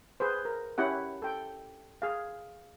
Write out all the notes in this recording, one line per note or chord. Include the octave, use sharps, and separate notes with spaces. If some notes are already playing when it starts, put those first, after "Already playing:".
G#4 B4 C5
A#4
C#4 E4 G4 F#5
A4 G5
G#4 F5